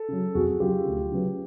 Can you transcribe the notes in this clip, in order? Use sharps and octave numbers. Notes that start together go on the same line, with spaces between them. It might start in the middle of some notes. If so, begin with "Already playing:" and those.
Already playing: A4
C#3 F#3
F2 F#4 G#4
C#3 F#3 F4 G4
D2
C#3 F#3 B3